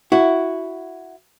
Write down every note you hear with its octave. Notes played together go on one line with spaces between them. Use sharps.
E4 F#4